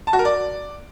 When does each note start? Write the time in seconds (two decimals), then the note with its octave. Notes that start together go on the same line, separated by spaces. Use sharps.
0.07 A5
0.13 F#4
0.19 A#4
0.25 D5